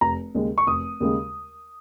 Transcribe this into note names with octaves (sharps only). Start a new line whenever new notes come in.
F1 A#5
D#2 C#3 G#3
C#6
F1 D#6
D#2 C#3 G#3